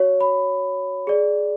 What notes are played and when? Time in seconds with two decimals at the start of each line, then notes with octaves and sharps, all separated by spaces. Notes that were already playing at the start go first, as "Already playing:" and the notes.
Already playing: F#4 C#5
0.21 B5
1.07 G#4 D5